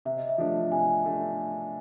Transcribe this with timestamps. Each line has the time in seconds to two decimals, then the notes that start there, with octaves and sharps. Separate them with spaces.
0.05 C3 E5
0.17 D#5
0.29 E5
0.38 F3 A3 D4
0.71 C3 G#5
1.04 A3 D4